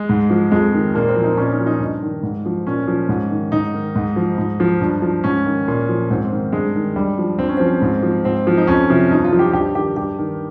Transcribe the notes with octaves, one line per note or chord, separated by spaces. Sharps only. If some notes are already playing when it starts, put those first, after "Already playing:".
Already playing: G#3
G#2
F3
F2 G#3
D#3
A#2 A#3
C4
F3
D#4
A#2 C#4
D#4
F3
D#4
G2
D#3
G#2
F3
A#2 C#4
F3
G#2
D#3
G#2 D#4
D#3
G#2
F3
G#2
F3
G2
F3
G#2 C#4
D#3
A#2
F3
G#2 C4
D#3
G2 G#3
D#3
G2 G3
F3
G2 C4
C#4
F3 C4
G#2
F3
G#2 C4
F3
D#4
F2 C#4
C3 F3
G2 D#4
F4
F3
G4
G2 G4
D#3 G4
G2 G4
D#3